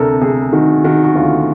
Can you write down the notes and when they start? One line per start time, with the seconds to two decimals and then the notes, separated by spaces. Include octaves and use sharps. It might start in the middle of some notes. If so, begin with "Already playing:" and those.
Already playing: D2 C3 A4 A#4
0.22 C3 G#4
0.53 D#3 F#4
0.84 D#3 F#4
1.05 F#4
1.15 D2 F4